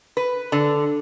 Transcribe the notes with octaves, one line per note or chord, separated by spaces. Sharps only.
B4
D3